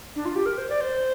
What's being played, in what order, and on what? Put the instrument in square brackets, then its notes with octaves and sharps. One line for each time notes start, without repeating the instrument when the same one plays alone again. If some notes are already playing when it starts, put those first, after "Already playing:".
[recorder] D4
F4
G4
A#4
C5
D5
C5